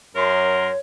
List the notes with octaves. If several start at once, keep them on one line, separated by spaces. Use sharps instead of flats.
F#2 A#4 C#5 C6